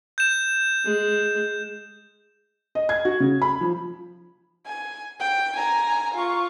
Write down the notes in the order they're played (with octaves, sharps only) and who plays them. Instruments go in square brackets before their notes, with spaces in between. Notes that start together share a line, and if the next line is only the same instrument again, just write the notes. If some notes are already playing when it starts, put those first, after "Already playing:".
[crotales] G6 E7
[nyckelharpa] G#3
[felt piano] D#5
G#6
F#4
C#3
B5
F3
[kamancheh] G#5
G5
G#5 A#5
F4 C#6